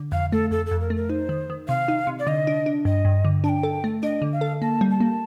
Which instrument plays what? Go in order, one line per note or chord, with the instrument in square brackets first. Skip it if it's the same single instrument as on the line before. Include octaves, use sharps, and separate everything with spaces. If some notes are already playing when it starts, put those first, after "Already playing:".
Already playing: [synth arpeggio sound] D3
[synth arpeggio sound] F2 [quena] F5
[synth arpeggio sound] A3 [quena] A4
[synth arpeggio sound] F2 [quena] A4
[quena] A4
[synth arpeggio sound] F2
[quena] A#4
[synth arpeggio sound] A3
[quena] A#4
[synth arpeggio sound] D#4 [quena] C5
[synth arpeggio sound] D#3
D#3
[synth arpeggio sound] C3 [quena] F5
[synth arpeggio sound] D#4
C3
[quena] D5
[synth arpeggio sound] D3 [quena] D#5
[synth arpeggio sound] D4
D4
[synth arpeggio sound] G2 [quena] D#5
[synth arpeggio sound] G2
D3
[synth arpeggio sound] D4 [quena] A5
[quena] G5
[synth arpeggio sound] A4
A3
[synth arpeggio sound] D4 [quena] D#5
[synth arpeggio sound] D3
[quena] F5
[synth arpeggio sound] A4
[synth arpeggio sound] A#3 [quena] A5
[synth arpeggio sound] G3
[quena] A5
[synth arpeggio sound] A#3